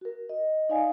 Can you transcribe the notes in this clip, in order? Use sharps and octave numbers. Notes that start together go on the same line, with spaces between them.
F#4 A#4
D#5
D#4 D5 F5 G#5